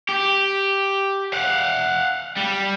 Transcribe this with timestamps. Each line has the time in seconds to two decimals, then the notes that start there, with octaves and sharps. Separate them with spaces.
0.09 G4
1.33 F5 F#5
2.36 G3